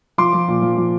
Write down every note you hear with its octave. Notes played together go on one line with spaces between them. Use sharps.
F3 C6 D6
F3
A#2
F3
F3